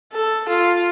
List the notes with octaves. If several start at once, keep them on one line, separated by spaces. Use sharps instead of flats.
A4
F4